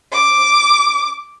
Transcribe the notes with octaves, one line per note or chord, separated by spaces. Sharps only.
D6